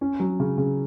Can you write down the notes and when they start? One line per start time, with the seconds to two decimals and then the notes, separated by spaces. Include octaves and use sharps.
0.01 C#4
0.20 F#3
0.40 C#3
0.58 C#3